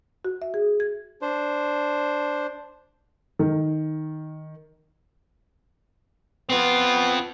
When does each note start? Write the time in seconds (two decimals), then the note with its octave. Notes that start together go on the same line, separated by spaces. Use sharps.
0.25 F#4
0.42 E5
0.54 G#4
0.80 G#6
1.22 D4 C5
3.39 D#3
6.50 B3 C4 F4